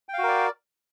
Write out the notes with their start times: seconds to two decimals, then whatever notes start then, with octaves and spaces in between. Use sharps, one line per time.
0.09 G5
0.14 F5
0.18 F#4
0.23 A#4
0.28 D5